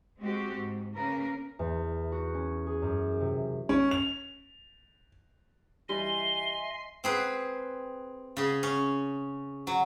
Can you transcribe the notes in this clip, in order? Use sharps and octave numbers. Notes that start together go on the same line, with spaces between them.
G#3 C4 F#4 G4
G#2
C#3 A#3 C#4 A#4 B4
E2
F#4
C#4
G#4
F#2
C3
C#4
F7
E3 G3 D#5 E5 G#5 C6 G7
C4 G#4 B4
C#3 G#4
C#4
F#3